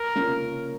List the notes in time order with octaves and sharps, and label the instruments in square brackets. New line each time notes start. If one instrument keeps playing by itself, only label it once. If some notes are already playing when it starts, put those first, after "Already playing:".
Already playing: [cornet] A#4
[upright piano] A#3 C#4 F4